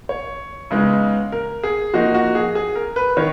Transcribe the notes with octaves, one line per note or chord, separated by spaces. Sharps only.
C#5
C#3 G#3 B3 D#4
A#4
G#4
F3 A#3 D#4 F#4
F#4
G#4
G#4
A#4
B4
D#3 C#5